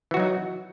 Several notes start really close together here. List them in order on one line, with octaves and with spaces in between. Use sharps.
E3 F#4 F#3 D#4